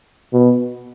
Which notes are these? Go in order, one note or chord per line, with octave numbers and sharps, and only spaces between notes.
B2